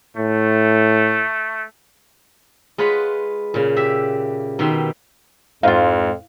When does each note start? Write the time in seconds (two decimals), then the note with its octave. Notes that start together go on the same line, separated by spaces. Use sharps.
0.17 A2 A3
2.78 G#3 F4 B4 C#5 F#5 B5
3.54 A#2 C#3
3.77 G4 E5
4.59 B2 D#3 G4 E5 C6
5.63 F2 G#2 D#4 F4 F5